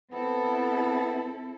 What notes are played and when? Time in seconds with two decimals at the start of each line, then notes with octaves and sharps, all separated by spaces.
0.12 B3 C4 E4 A4